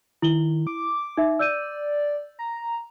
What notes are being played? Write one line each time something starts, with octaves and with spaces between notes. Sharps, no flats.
D#3 E4 F#7 G7
D6
D#4 E5
D5 E6 G6 D#7
A#5